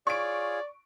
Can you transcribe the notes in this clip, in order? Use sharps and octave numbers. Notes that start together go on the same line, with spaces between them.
F4 G#4 C#5 D5 C#6 D7